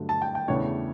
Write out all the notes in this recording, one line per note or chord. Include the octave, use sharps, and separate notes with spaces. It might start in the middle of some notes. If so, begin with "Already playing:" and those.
Already playing: G2 D3 F#3 A3
A5
G5
G5
E2 C#3 E3 A3 D4 C#5